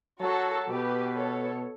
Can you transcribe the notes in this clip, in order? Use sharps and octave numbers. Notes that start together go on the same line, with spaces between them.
F#3 F#4 A4
B2 G4 B4
A4 C#5